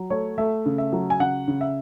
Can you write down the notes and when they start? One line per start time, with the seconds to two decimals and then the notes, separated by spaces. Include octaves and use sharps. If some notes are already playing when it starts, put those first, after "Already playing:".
Already playing: F#3
0.10 A3 C#5
0.38 A3 E5
0.66 C#3
0.78 E5
0.93 F#3
1.10 G#5
1.20 C#3 F#5
1.48 C#3
1.61 E5